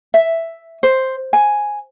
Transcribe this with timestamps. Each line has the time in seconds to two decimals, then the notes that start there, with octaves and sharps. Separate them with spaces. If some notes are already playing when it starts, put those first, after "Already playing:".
0.14 E5
0.83 C5
1.33 G#5